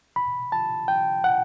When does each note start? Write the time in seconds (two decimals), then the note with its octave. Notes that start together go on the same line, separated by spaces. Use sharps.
0.16 B5
0.52 A5
0.88 G5
1.24 F#5